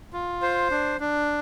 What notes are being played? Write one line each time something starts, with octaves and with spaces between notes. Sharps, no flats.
F4
C5
D4
D4